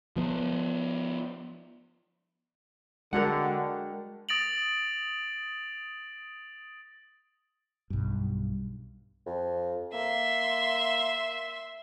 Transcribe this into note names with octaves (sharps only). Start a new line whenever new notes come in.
F3 B3
D3 G#3 F#4 A#4 F#5 G5
D#6 A6 A#6 D7 F7 F#7
B1 G2
F2
A#3 E5 C6